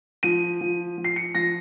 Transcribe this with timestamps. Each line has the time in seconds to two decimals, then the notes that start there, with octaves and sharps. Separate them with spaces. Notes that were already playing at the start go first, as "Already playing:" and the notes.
0.23 F3 D#7
0.61 F3
0.97 F3
1.04 C7
1.16 C#7
1.35 F3 A#6